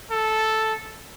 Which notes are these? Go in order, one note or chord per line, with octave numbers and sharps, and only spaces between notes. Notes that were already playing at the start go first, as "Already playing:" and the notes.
A4